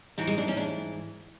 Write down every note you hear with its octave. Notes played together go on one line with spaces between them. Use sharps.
G#2 E3 F#3
G#3
D4
C#4
D4